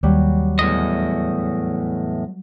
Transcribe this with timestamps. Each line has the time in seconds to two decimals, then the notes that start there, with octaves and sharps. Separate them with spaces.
0.03 D#2 F#3 G3
0.59 E2 A2 D#5